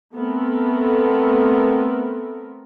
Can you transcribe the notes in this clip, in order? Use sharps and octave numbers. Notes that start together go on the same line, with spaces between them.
A3 B3 C4 A4 A#4